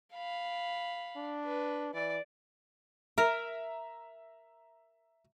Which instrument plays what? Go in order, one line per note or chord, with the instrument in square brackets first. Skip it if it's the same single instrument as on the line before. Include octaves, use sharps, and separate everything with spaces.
[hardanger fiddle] F5 B5
[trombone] D4
[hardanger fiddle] B4
[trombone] E3 [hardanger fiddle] D5
[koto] A#4 [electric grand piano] E5 A#5